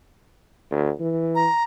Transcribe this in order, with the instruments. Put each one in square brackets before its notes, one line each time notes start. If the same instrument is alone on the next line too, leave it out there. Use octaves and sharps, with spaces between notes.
[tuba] D2
E3
[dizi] A#5